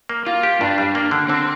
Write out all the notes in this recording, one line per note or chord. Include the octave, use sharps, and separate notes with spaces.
A#3
A#3 F4
G4
G2 D4
G3
A#3
D3
D3 C4